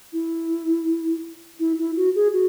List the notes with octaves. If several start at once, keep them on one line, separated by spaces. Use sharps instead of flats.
E4
E4
E4
F#4
G#4
F#4